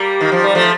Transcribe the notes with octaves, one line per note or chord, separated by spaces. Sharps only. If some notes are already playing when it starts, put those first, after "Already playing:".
Already playing: G3 A#3
D#3
F3
G3
F3 A3